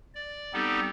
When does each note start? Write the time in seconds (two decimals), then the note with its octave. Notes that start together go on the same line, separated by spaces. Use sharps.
0.15 D5
0.53 G3 B3 C4 D#4 G4 A4